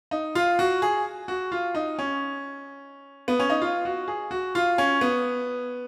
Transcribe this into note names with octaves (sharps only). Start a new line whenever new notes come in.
D#4
F4
F#4
G#4
F#4
F4
D#4
C#4
B3
C#4
D#4
F4
F#4
G#4
F#4
F4
C#4
B3